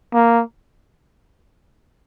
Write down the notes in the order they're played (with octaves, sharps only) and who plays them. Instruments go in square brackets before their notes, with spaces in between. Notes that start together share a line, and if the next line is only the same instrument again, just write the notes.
[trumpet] A#3